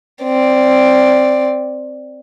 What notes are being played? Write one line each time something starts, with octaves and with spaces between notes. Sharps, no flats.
C4 D5